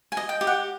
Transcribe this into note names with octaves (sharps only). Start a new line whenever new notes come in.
G#5
D#5
G5
G4
F#5